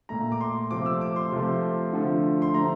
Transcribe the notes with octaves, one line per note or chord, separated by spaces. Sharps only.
A#2 A3 A#5
D6
C6
C3 F3 A3 D6
E6
D6
C6
C3 F3 A3
D3 F3 A3
C6
D3 F3 A3 A#5